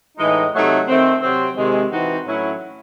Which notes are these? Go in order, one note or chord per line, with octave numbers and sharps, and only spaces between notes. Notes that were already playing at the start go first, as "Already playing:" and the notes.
A2 E3 G#3 D#4
C3 F#3 A3 D#4
D#3 A3 C4
C3 F#3 C4
C3 D#3 G#3
E3 C4 D#4 F#4
A2 F#3 C#4 E4